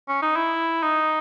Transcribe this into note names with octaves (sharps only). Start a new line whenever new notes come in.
C#4
D#4
E4
D#4